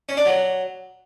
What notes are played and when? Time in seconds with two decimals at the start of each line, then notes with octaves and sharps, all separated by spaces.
0.09 C#4
0.17 D4
0.25 F#3